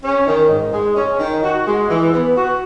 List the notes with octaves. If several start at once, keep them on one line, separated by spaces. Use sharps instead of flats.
C#4
D#3
G#2
G#3
C#4
D#3
F#4
G#3
E3
B3
F#4